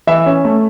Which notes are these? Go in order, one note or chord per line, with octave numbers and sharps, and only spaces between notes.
E3 E5
C#4
A3